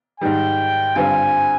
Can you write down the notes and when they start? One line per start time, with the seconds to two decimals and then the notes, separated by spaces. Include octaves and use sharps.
0.20 G#2 D#3 G3 G5
0.96 G2 D3 G3 C4 F4 G#5